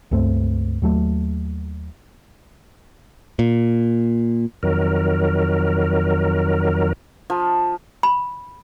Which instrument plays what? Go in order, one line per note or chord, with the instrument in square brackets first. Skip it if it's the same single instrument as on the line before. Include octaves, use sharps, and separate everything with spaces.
[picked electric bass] C#2 G2 A3 C4
D#2 F#3 A3
A#2
[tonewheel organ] F2 D#3 F#3 A#4
[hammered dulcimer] F3
[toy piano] B5